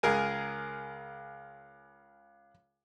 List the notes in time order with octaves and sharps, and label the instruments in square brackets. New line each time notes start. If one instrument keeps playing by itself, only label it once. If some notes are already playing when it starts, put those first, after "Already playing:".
[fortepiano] C#2 G#4 A#4 G#5